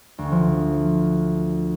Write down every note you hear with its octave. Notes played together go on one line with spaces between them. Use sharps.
D2
F3